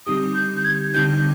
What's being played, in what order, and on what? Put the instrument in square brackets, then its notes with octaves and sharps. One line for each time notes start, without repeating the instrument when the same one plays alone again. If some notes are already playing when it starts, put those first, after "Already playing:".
[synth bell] D3 G3 C4 D#4 G4 [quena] D#6
[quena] G6
G6
G#6
[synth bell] D3 G3 C4 D#4 G4 [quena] G6